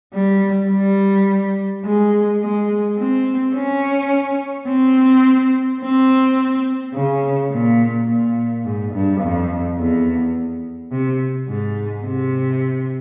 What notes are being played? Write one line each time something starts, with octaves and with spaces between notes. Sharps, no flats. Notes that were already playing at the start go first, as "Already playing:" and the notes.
G3
G3
G#3
G#3
C4
C#4
C4
C4
C#3
A#2
A#2
G#2
G2
F2
E2
C3
G#2
C3